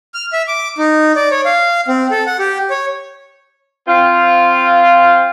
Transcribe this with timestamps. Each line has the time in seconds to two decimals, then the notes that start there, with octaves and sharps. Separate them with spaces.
0.14 F6
0.33 E5
0.48 D6
0.78 D#4
1.16 D5
1.31 C#5
1.45 F5
1.88 C4
2.11 A4
2.26 F#5
2.39 G4
2.70 C#5
3.87 C4 F4